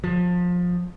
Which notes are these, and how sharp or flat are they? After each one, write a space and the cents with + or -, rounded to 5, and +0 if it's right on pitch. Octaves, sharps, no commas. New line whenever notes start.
F3 +25